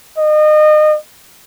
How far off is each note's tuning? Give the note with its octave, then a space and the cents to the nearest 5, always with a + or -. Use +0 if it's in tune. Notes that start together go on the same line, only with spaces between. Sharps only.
D#5 -30